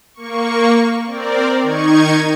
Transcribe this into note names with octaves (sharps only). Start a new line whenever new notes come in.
A#3 C#6
C4 A#4 D5
D#3 D#4 C#6 G#6